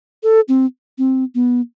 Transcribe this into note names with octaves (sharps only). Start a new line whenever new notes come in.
A4
C4
C4
B3